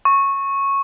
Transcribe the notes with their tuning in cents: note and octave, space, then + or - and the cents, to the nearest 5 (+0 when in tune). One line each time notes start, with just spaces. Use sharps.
C#6 -10